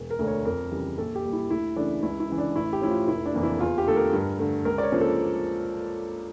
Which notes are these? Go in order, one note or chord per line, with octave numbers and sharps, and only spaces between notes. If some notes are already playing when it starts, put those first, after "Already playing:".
Already playing: E1
A#4
D2 D3 A3 D4
C#5
F2 A#4
C#3 E3 G3
A#1 A4
G4
A#2 G3
E4
D2 E4
C#3 E3 A3 D4
C#2 E4
E4
C#3 E3
D4
A1 E4
G4
A2 F3 C#4 E4
F4
F1 E4
D4
F2 E3 A#3
E4
E2 F4
G4
D3 A3 A4
A#4
G2
D3 A3
C#2 A#4
D5
C#5
C#3 F3 A#3 D4
A4